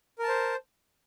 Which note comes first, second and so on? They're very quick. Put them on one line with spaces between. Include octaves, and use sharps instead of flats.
A#4 A5 C5